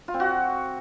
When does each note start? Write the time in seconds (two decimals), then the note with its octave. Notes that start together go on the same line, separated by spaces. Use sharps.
0.08 F4
0.14 C4
0.20 F#4